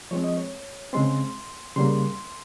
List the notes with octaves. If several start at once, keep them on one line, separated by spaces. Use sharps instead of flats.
F3 G#3 C4 C#5
D#5
C#5
C#3 G#3 C4 C6
C#3 G3 A#3 C6